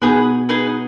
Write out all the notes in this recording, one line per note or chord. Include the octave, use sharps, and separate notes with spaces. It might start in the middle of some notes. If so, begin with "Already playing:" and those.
B2 B3 D#4 G#4 B4
D#4 G#4 B4